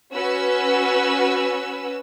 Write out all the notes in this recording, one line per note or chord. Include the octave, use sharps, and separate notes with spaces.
C#4 F#4 B4 E6